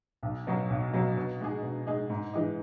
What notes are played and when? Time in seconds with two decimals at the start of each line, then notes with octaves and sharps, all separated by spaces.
0.23 B1
0.47 B2 F#3 C#4
0.70 B1
0.93 B2 F#3 C#4
1.17 B2
1.41 G#3 D#4 G#4
1.63 B2
1.87 G#3 D#4 G#4
2.10 G#2
2.33 E3 G#3 D#4